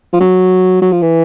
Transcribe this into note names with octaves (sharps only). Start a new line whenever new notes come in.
F3
F#3
F#3
F3
E3